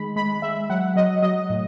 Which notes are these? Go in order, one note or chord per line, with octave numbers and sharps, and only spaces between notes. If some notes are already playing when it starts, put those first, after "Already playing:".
Already playing: D#3 G#3 B5
G#3 B5
G#3 E5
F#3 F#5
F#3 D#5
F#3 D#5
A2